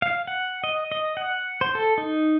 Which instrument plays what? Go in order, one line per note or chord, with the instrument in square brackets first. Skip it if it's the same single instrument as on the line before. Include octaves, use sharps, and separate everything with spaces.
[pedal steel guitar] F5
F#5
D#5
D#5
F#5
C5
A4
D#4